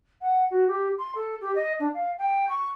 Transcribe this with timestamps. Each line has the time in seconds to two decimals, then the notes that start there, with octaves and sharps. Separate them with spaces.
0.21 F#5
0.51 F#4
0.68 G4
0.98 C6
1.15 A4
1.41 G4
1.55 D#5
1.80 D4
1.94 F5
2.18 G5
2.49 C#6